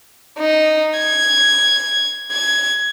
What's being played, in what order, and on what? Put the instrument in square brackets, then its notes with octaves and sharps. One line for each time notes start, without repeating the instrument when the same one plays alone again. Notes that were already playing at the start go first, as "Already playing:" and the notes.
[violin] D#4
G#6
G#6